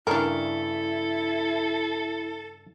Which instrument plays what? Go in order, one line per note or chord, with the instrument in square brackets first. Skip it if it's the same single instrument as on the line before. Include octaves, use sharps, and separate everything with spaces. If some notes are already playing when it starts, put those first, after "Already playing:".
[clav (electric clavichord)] G2 C#3 [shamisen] D4 A#4 [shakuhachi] E4 [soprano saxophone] A4